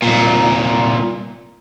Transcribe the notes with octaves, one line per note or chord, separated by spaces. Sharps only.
C2 A#2